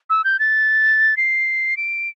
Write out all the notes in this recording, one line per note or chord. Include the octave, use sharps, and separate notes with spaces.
E6
G6
A6
C7
D7